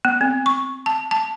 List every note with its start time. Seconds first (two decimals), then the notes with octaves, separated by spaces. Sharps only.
0.05 B3
0.21 C4
0.46 C#6
0.86 A5
1.11 A5